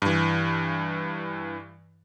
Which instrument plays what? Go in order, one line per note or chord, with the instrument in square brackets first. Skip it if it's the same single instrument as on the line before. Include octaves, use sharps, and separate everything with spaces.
[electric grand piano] G2 E3